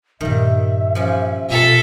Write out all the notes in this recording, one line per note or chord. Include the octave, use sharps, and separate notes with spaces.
G2 A#2 D#3 G3 E5
F3 G3 C#4
B2 F4 A4 E5